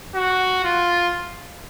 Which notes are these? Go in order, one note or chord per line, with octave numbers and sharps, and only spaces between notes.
F#4
F4